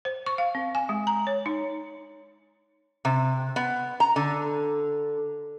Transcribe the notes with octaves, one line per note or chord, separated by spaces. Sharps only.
C5
C#6
F5
C4
G#5
G#3
A#5
C#5
D#4
C3
B3
A#5
D3